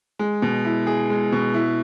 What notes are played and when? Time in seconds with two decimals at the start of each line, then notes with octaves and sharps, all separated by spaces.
0.19 G#3
0.42 B2
0.65 E4
0.87 G#4
1.10 G#3
1.32 B2
1.54 E4